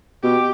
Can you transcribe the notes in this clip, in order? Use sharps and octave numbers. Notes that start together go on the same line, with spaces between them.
B2 G4